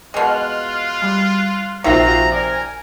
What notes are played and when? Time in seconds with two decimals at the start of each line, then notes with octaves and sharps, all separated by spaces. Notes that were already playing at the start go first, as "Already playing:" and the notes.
0.14 B2 G#3 F4 F6 F#6
1.02 G3
1.84 A#1 C3 C4 D#4 F4 F#4 E5 A#5
2.32 A#4 D5 G#5